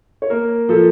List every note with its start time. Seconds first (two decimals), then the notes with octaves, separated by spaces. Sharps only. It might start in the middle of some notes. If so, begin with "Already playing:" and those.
0.22 C#5
0.30 A#3 A#4
0.69 F3 A4